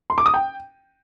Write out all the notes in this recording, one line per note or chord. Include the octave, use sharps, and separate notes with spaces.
C6
D6
D#6
G5